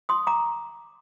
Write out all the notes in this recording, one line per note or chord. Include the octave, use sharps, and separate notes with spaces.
C6 D#6
A#5 D6